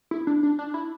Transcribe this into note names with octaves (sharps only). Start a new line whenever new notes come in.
E4
D4
D4
D4
E4